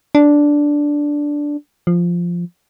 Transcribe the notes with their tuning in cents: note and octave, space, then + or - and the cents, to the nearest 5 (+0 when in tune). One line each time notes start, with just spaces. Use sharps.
D4 -5
F3 -5